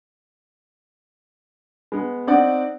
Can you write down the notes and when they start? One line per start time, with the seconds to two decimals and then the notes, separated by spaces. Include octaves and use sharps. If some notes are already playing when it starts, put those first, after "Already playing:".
1.92 G#3 B3
2.27 C4 D#4 D5 F#5